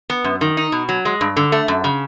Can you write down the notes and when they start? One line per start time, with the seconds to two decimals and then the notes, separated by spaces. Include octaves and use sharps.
0.10 B3
0.24 F#2
0.41 D#3
0.57 D#4
0.72 B2
0.89 F#3
1.05 G#3
1.21 G2
1.37 D3
1.52 A3
1.68 F#2
1.84 C#3